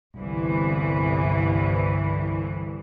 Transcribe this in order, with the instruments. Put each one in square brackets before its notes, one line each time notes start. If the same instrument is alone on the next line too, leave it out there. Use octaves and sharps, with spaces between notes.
[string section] G1 C2 E3